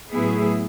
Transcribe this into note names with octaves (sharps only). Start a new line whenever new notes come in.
A2 F#3 B3 E4 G#4